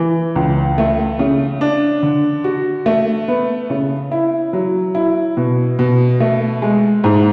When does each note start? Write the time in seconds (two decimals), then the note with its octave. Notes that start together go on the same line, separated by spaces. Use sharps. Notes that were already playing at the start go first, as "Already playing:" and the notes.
Already playing: E3
0.36 C#2
0.78 A3
1.19 C#3
1.61 D4
2.03 D3
2.44 F#4
2.86 A3
3.28 B3
3.70 C#3
4.11 E4
4.53 F#3
4.95 E4
5.37 B2
5.79 B2
6.20 A3
6.62 G#3
7.04 G#2